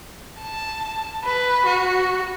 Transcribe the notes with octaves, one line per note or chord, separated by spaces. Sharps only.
A5
B4
F#4